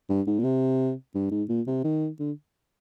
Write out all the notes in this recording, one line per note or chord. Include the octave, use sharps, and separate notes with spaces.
G2
G#2
A#2
C3
G2
G#2
A#2
C3
D#3
D3